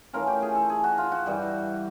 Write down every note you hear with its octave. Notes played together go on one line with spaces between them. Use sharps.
E3 A3 C#4 F4 A#4
G4
G#4
A4
G#4
F#4
F4
F#4
G2 E3 G3